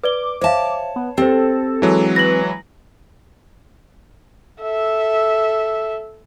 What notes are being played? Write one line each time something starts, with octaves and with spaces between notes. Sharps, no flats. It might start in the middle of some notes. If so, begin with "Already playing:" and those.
B4 D5 D6 G7
C5 C#5 E5 F5 A5
B3
C4 G4 A4 C5
E3 F#3 G#3
B4 A#6 F#7
A4 E5